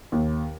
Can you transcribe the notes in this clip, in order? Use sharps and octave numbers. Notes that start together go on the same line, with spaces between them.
D#2